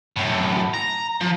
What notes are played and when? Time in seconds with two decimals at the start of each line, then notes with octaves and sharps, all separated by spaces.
0.16 F#2 A2
0.74 A#5
1.21 F3